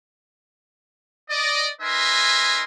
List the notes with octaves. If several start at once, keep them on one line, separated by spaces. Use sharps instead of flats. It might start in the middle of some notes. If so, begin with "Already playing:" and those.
D5 D#5
D#4 A#4 B4 E5 G#5 C6